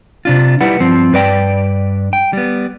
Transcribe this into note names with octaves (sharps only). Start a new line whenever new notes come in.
C3 D4 F4
G3 E4 B4 F#5
G2 F3 C4
G2 B4 D5 G5
G5
G3 B3